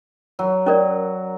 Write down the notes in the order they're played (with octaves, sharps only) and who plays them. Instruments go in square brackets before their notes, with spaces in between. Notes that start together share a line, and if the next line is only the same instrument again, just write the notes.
[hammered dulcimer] F#3
[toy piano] C#4 A#4 D5